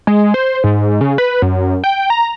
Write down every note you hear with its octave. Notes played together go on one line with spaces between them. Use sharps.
G#3
C5
G#2
C#3
B4
F#2
G5
A#5